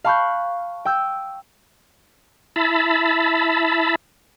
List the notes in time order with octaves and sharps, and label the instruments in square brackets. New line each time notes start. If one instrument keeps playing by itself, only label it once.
[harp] F5 A5 B5 C#6 F#6 G6
G5 E6 G6
[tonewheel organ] E4 A5 B5